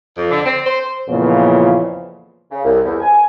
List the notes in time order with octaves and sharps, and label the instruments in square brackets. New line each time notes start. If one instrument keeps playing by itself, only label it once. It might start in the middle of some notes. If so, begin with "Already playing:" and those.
[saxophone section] F2
D3
C4
C5
[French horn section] F2 A#2 C#3 E3 F3 B3
[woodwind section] C#3
C2
E2
G#5